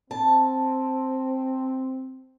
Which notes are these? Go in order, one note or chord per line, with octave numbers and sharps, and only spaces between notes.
C4 A5